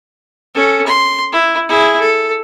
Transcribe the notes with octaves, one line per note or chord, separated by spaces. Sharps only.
C#4 A4
C6
E4
E4 G#4
A4